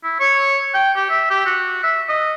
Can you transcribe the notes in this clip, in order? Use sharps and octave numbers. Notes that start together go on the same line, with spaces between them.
E4
C#5
G5
G4
E5
G4
F#4
E5
D#5